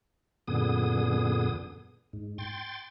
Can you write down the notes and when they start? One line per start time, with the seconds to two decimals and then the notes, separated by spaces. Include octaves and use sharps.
0.48 F#2 A#2 D3 B3 G#4 D#6
2.13 G#2
2.38 G5 C6 A6